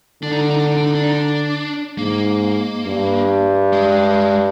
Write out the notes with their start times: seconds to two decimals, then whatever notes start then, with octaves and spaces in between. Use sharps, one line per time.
0.23 D3 D4
0.32 D#4
0.41 D4
0.50 D#4
0.59 D4
0.68 D#4
0.77 D4
0.86 D#4
0.95 D4
1.04 D#4
1.13 D4
1.98 G#2 A#3
2.86 G2
3.73 G#3